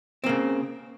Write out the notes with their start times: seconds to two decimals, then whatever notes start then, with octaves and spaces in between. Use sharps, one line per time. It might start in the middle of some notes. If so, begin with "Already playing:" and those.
0.24 C4
0.26 A#3
0.29 C#3